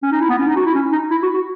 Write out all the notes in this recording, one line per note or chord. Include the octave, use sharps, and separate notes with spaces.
C#4
D#4
E4
B3
C#4
D#4
F#4
E4
C#4
D#4
E4
F#4
F#4